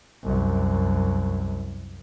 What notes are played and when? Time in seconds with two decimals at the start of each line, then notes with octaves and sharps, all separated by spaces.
0.24 C2 F#2